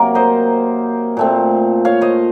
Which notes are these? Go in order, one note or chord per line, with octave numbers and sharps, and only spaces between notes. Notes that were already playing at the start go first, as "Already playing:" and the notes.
Already playing: C3 F#3 A#3 A#4
C5 D#5
A#2 A3 C4
C#5 F5
C5 D#5